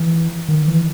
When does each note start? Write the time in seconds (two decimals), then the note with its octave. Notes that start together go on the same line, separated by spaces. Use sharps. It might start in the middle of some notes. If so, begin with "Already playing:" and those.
Already playing: E3
0.48 D#3
0.68 E3